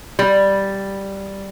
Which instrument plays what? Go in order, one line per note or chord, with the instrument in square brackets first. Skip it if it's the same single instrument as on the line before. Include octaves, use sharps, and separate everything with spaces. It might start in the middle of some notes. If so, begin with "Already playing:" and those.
[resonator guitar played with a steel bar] G3